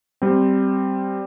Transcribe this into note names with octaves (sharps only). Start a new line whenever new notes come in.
G3 C4